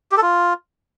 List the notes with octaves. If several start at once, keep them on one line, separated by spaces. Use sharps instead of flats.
G4
A4
F4